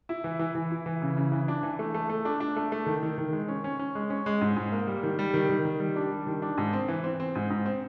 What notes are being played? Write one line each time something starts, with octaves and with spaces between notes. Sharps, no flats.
E4
E3
E3
E3
E4
E3
C#3
C#3
E3
D4
E3
A3
A3
A3
D4
D4
A3
A3
D#3
D#3
D#3
G#3
C#4
C#4
C#4
G#3
C#4
G#3
G#2
G#2
A#3
G3
D#3
G3
D#3
D#3
D#3
G3
D4
G3
D#3
D4
G#2
C4
E3
C4
C4
G#2
G#2
C4